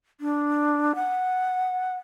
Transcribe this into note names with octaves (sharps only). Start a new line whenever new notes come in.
D4
F#5